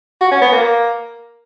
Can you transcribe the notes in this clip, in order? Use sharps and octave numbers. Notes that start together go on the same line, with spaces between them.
F#4
C#4
B3
A#3